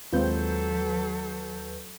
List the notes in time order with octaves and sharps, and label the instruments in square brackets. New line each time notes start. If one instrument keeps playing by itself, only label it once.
[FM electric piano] D#2 B4 G6 [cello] F#3 A4 [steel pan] G#3 C4 F4